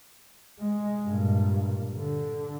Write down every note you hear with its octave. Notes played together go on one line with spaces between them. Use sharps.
G#3
G2 A#2
D3